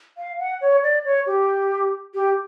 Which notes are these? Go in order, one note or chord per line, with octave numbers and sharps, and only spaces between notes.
F5
F#5
C#5
D5
C#5
G4
G4